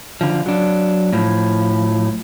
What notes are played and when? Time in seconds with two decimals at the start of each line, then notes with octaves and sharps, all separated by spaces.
0.21 D3 F3
0.46 F#3 D4
1.13 A2 F3